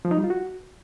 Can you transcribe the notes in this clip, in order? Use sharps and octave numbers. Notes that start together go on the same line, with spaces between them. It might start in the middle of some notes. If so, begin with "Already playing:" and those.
F3
D#4
G3
F4
F#4